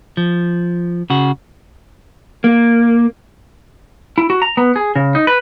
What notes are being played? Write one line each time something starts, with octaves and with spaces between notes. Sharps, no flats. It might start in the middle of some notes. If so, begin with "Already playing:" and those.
F3
C#3 F#4
A#3
E4
F#4
A#5
B3
G#4
C#3
D#4
B4